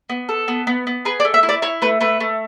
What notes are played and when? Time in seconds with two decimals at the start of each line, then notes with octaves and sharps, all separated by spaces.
0.10 B3
0.29 A4
0.48 B3
0.67 B3
0.87 B3
1.05 G#4 B4
1.20 D5
1.25 A3
1.34 E5
1.43 E4
1.49 D5
1.62 E4 C#5
1.82 A3 B4
2.01 A3 B4
2.20 A3